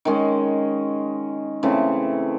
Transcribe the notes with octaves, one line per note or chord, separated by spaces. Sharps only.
D#3 G#3 C#4
C#3 E3 A3 C4